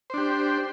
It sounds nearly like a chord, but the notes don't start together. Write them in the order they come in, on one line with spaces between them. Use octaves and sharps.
C5 D4 G4